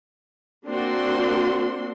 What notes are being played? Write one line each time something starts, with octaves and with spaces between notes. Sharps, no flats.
A#3 C4 D4 F#4 C6